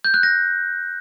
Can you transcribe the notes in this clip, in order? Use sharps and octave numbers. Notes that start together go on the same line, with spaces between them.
G6
F#6
A#6